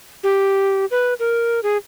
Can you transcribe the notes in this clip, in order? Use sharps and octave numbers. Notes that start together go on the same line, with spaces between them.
G4
B4
A#4
G#4